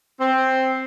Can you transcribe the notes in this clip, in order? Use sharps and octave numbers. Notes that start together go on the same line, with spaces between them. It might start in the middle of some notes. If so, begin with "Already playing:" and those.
C4